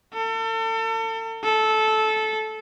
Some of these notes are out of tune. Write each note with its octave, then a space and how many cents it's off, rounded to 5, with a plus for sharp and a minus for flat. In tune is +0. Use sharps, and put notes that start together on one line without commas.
A4 +35
A4 -15